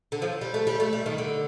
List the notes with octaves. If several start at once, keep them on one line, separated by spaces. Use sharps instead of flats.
D3
F3
G3
A3
G3
A3
G3
D#3
D3